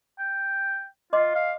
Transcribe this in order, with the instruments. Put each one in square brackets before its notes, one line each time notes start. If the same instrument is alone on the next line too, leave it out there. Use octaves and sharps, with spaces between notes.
[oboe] G5
[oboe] F4 [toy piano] D#5 C6 D6
[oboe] F5